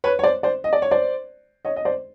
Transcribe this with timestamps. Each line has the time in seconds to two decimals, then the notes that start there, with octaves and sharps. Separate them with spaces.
0.04 B4 C#5
0.19 C#5
0.24 C5 D5
0.43 C5 D5
0.64 D#5
0.73 D5
0.82 C#5
0.91 C5 D5
1.65 C#5 D#5
1.76 D#5
1.85 C5 D5